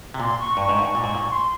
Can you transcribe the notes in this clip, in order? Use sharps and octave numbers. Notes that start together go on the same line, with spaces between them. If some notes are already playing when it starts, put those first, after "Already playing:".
C3
A#2 C6
C#6
G2 C#6
G#2
G2
A#2
G#2
A#2
C#6
C6